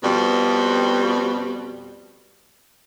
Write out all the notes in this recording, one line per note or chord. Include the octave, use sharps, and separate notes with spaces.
F2 B2 G3